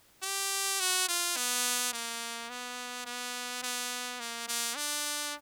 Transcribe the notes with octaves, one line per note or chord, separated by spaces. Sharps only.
G4
F#4
F4
B3
A#3
B3
B3
B3
A#3
A#3
D4